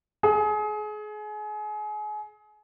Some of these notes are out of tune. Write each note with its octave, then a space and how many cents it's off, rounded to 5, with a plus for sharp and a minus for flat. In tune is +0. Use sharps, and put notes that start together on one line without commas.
G#4 +30